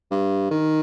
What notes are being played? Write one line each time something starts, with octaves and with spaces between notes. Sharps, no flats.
G2
D#3